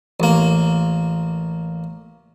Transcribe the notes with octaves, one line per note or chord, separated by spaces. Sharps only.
A1 A#3